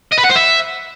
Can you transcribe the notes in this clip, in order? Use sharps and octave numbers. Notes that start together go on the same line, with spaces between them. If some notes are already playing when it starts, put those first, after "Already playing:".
D#5
B4
F#5
C5
E5